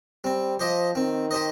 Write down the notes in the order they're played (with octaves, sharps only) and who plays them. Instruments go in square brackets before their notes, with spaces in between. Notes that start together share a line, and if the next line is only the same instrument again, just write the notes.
[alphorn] G3 [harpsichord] C4
[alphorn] F3 [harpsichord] G4 C5 D#5
[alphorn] D#3 [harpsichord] C4
[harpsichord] G4 C5 D#5